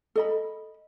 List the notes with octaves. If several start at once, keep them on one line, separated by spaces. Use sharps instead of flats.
A4 D#5 B5